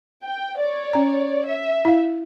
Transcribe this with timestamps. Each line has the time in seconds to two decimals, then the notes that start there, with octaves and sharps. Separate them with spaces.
0.24 G5
0.60 C#5 D5
0.93 C#4 A#5
1.47 E5
1.85 E4 F5